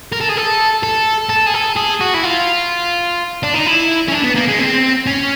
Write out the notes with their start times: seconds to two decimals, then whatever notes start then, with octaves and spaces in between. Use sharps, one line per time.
0.13 A#4
0.21 A4
0.29 G#4
0.37 A4
0.83 A4
1.29 A4
1.46 G#4
1.54 A4
1.76 G#4
2.01 F#4
2.14 E4
2.24 F4
3.43 D4
3.54 D#4
3.66 E4
4.08 C#4
4.12 D4
4.24 B3
4.36 A#3
4.48 G#3
4.59 C4
5.06 C#4